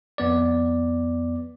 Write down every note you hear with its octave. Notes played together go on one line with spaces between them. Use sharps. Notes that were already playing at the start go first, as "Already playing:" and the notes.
F2 B3 D5